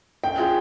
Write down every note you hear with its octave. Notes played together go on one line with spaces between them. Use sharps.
C#4 G5
F4 G#4